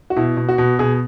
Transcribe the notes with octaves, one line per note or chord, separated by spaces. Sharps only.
F#4
B2 E4
B2
F#4
B2
B2 G#4